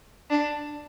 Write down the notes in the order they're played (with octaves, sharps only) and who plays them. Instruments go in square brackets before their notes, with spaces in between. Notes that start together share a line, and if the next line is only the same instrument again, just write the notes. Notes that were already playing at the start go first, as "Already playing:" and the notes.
[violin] D4